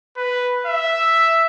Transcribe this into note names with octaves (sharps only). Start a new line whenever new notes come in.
B4
E5